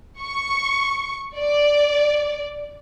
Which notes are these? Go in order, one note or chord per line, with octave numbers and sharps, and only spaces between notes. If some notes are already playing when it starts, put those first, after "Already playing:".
C#6
D5